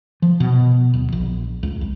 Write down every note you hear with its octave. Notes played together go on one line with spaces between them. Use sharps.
F3
B2
D1
A#1
C#2
C2